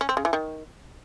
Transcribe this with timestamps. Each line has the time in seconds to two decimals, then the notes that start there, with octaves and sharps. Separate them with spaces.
0.01 C#4
0.09 C4
0.17 C#3
0.25 E3
0.33 D#3